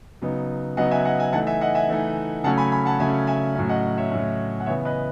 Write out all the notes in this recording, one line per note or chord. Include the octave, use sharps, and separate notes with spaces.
C#3 F#3 B3 D#4
C#3 F#3 B3 D#4 D#5 F#5
E5 G#5
D#5 F#5
E5 G#5
E3 A3 D#4 F#5 A5
E5 G#5
D#5 F#5
E5 G#5
E3 A3 D#4
C#3 F#3 A3 C#4 F#5 A5
G#5 B5
G#5 B5
F#5 A5
C#3 F#3 A3 C#4 E5 G#5
E5 G#5
A2 F#3 C#4
D#5 F#5
C#5 E5
A2 F#3 C#4
F#5
C#3 E3 B3 C#5 E5
B4 D#5